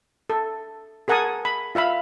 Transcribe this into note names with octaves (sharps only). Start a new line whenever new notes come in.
A4
G#4 A#4 F#5 G#5 A5 D#6
B5
F4 E5 F5 B5